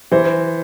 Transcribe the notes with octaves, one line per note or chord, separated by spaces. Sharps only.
E3 C5